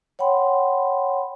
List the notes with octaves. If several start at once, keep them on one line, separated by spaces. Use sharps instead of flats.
C#5 F#5 G5 B5 C6